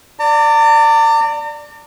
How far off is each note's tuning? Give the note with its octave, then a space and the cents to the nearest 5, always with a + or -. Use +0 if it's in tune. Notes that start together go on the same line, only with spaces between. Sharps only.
D5 +0 A#5 -45